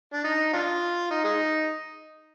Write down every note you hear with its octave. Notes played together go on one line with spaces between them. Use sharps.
D4
D#4
D4 F4
D#4
G#3 D#4